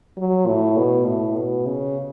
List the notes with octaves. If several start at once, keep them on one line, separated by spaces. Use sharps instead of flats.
F#3
A2
B2
A2
B2
C#3